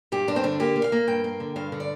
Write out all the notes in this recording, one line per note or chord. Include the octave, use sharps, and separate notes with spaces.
G2 G4
G2 D4
C4
D3 D4
A#3 G4
A#3
F5
A#3
G2 G5
A#3
D3
G2 F5
D3
D5